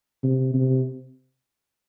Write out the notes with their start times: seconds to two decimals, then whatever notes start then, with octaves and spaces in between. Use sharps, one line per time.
0.23 C3
0.54 C3